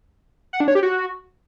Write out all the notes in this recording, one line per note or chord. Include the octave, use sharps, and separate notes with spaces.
F#5
D4
C#5
G4
F#4